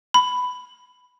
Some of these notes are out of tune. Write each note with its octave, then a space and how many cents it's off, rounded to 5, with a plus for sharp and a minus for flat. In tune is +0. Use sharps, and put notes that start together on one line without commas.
B5 +10